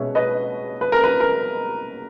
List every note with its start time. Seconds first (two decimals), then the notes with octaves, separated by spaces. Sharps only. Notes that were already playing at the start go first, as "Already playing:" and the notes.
Already playing: B2 G#3 C#4 B4 C#5 E5
0.15 B4 D#5
0.81 B4
0.92 A#4
1.04 B4
1.20 A#4